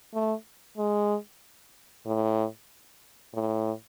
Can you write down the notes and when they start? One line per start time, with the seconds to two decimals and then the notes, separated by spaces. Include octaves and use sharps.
0.14 A3
0.77 G#3
2.06 A2
3.33 A2